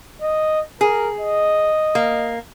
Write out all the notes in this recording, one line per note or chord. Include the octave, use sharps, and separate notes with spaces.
D#5
G#4 A#4
D#5
A#3